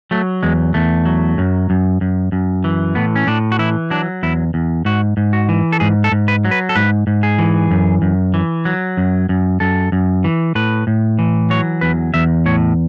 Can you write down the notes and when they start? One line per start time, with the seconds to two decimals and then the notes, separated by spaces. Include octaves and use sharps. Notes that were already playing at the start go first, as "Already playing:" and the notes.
0.11 F#3 A3
0.43 E2 G#3
0.74 E2 A3
1.05 F#3
1.38 F#2
1.70 F#2
2.01 F#2
2.32 F#2
2.64 E3
2.95 A2 B3
3.16 C#4
3.27 A2 D4
3.52 F#4
3.59 E3 E4
3.90 F#3 D4
4.23 E2 E4
4.54 E2
4.85 G#2 F#4
5.17 G#2
5.33 F#4
5.49 E3
5.72 A4
5.80 G#2 G#4
6.04 A4
6.12 G#2
6.28 B4
6.45 F#3
6.51 B4
6.69 A4
6.76 G#2 B4
7.07 G#2
7.23 G#4
7.39 E3
7.71 F#2
8.02 F#2
8.34 E3
8.65 F#3
8.97 F#2
9.29 F#2
9.60 F#2 A4
9.92 F#2
10.24 E3
10.55 A2 B4
10.87 A2
11.19 E3
11.50 F#3 C#5
11.81 E2 B4
12.14 E2 E5
12.46 A2 C#5